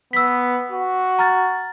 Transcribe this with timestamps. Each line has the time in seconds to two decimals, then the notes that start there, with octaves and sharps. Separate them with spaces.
0.13 B3 E6 B6
0.72 F#4
1.19 A#5 F6 A6